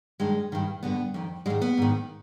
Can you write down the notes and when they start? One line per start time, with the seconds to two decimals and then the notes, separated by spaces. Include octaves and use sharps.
0.20 G2 D#3 G#3
0.52 G2 D#3
0.83 G2 D3 B3
1.14 F2 D#3
1.46 G#2 D#3 G#3
1.62 B3
1.77 G#2 D#3